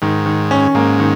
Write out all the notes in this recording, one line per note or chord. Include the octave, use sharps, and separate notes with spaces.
G#2 D#3
D#3
C#4
G#2 A#3
D#3